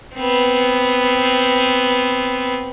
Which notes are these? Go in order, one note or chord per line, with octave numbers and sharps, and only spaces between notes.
B3 C4